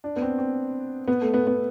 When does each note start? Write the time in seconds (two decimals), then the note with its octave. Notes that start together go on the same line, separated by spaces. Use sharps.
0.04 D4
0.16 B3
0.22 C4
0.39 C4
1.07 B3
1.22 A3
1.34 B3
1.47 B3